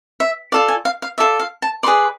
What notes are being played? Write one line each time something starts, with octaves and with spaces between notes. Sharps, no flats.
E5
F4 A4 D5 F5
G#5
F5
F5
F4 A4 D5 E5
F5
A5
G#4 B4 D5 C6